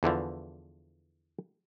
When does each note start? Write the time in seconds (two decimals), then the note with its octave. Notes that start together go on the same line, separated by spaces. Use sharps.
0.03 E2 D3 E3 F3